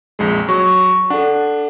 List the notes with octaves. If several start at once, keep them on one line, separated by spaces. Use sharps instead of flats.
A#1 F2 G#3
F#3 C#6
D4 A4 F#5